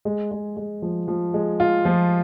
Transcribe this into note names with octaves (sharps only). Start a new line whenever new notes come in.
G#3
G#3
G#3
F3
F3
G#3
F4
F3